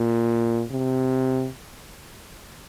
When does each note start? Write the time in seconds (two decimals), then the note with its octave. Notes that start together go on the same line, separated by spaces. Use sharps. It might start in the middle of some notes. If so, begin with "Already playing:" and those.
Already playing: A#2
0.71 C3